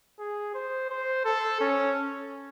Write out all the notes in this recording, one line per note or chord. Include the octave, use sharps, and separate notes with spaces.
G#4
C5
C5
A4
C#4